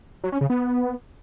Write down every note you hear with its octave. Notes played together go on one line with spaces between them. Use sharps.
F#3
C#4
C#3
B3